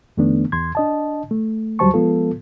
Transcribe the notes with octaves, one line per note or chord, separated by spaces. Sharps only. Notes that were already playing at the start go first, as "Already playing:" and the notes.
F2 D#3 A3 B3 D4
E2 C6 G#6
D4 D#5 A5
A3
D2 F#3 G3 C5 A5 C#6
F3 G#3 B3 F4 A4